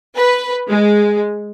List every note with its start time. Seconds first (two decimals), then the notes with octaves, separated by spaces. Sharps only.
0.17 B4
0.68 G#3